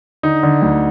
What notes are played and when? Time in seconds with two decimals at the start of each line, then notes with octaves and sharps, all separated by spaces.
0.23 D3 D#4
0.43 D3
0.62 D2